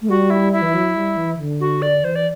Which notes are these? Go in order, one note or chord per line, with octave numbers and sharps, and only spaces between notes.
A3
G3 F#4
E4
E4
E3
F#3
G3
E3
D3
F#4
D5
E3 C5
D5